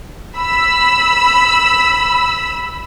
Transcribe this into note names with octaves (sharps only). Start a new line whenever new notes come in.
B5 E6